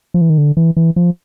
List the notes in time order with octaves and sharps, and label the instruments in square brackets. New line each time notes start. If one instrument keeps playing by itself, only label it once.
[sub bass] F3
E3
D#3
D3
E3
E3
F3